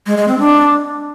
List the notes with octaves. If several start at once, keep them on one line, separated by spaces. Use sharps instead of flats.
G#3
G#3
C4
D4